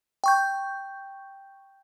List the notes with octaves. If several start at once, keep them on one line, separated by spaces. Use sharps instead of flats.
G5 C#6 G6